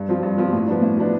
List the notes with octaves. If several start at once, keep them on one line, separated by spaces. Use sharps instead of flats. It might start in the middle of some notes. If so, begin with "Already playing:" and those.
Already playing: G2
F3 C4 F4
G2
F3 C4 F4
A2
F3 B3 D4
A2
F3 B3 D4